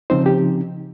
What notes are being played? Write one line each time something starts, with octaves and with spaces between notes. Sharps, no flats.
C#3 F3 C4 D#4 C5
G4